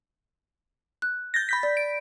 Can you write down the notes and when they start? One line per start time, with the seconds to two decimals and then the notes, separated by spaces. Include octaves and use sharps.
1.02 F#6
1.34 G6 A6 A#6
1.49 B5 G6 B6
1.63 D5
1.77 D7